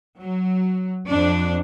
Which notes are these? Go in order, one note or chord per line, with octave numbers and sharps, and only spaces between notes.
F#3
F2 D4